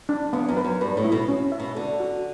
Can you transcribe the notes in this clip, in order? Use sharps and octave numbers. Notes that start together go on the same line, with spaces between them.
D4
E2 B3
F#2
B4
F#2
G2 B4
A2
E4
B2
C#4
E5
B2
D3 A4
F#4